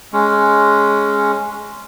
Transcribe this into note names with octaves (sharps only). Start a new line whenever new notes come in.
G#3 C#4